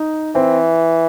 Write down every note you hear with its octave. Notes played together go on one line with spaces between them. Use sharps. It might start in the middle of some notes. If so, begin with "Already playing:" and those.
Already playing: D#4
E3 C4